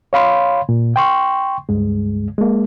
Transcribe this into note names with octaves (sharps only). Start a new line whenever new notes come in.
C#5 F5 B5 C6
A#2
G5 C6 C#6
C#2 G2 G#3
G#3 A#3